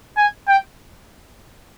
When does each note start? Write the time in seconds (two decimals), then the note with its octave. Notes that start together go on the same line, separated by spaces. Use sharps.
0.17 G#5
0.48 G5